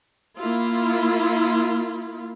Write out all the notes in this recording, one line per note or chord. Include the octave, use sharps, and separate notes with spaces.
A#3 E4 F4